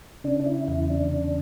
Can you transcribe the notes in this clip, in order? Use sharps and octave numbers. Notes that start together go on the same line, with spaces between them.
C#3 D4
D4
E4
E2 E4
D4
C#3